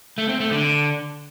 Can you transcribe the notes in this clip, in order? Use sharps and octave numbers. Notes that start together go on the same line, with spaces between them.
A3
C4
A3
D3